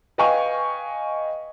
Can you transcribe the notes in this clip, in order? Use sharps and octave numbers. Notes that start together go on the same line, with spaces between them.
B4 D#5 F5 G5 G#5 C#6